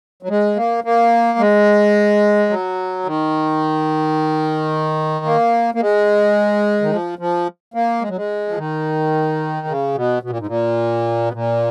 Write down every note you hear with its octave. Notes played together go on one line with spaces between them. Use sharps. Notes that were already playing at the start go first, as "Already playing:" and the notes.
F#3
G#3
A#3
A#3
G#3
F#3
D#3
A#3
A#3
G#3
D#3
F3
F3
A#3
G#3
F#3
G#3
F3
D#3
C#3
B2
B2
A#2
G#2
A#2
B2
A#2